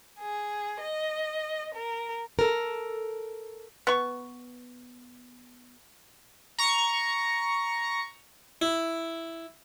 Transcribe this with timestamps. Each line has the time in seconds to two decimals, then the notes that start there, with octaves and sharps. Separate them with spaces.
0.18 G#4
0.78 D#5
1.74 A#4
2.39 A4 A#4
3.87 B3 C#6
6.59 A#5 C#6 C#7
8.62 E4